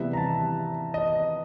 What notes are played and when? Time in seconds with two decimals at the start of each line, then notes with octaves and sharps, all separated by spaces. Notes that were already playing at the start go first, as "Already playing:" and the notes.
Already playing: C3 E3 G3 B3 E5
0.13 A#5
0.17 A5
0.94 D#5